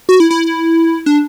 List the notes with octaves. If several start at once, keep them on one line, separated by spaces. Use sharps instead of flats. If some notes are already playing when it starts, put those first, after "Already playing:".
F#4
E4
E4
D4